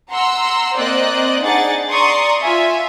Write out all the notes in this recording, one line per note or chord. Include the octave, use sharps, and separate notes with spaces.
F#5 A#5 C6 E6
A#3 C4 C5 D5 D#5 F#6
D4 D#4 G#4 D5 F#5 A6
D5 A#5 C6 C#6 D#6
F4 E5 G#5